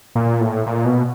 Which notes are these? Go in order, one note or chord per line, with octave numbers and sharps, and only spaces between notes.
A#2
A2
A#2
B2